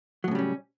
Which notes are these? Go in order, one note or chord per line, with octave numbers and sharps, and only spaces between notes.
A2 C#3 F#3 G3 C#4